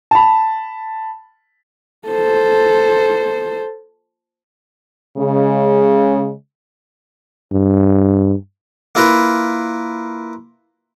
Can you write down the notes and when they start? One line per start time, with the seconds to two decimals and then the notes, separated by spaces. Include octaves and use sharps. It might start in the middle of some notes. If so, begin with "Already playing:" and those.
0.11 A5 B5
2.08 A4 C5
5.17 C#3 G#3
7.52 G2
8.95 A#3 E4 F4 A#4 B4